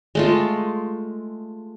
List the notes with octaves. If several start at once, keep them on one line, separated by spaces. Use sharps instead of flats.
G#3 A3 F4